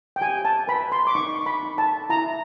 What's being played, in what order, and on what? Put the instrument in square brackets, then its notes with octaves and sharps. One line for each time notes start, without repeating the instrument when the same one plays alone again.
[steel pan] G5
G4 G#5
A5
B4 B5
C6
D6
D#4 C#6
B5
D#4
A5
E4 A#5